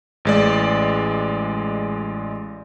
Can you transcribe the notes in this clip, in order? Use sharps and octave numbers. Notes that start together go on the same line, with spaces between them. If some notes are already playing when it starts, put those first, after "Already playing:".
A1 G#3 D5